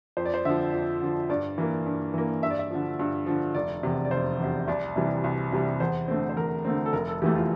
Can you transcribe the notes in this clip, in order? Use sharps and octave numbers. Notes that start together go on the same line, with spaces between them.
F2 C5
D5
C5
D3 F3 E5
F2
D3 F3
G2 D5
E3 A#3
G2
E3 A#3
G2 E5
D5
E5
D3 F3
G2
D3 F3
F1 D5
E2 C3
D5
F1 C5
E2 C3
C2 D5
C3 E3 G3
C2
C3 E3 G3
E2 C5
D3 A3 C4
C5
E2 A#4
D3 A3 C4
A4
F1 A#4
A4
E2 E3 A3 G4
F4